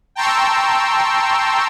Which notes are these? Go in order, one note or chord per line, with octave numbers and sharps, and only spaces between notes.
G5 A5 A#5 C6 C#6 E6